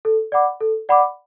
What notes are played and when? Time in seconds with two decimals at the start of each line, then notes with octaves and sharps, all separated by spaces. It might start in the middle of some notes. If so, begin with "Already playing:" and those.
0.05 A4
0.32 D5 F#5 B5 D6
0.61 A4
0.89 D5 F#5 B5 D6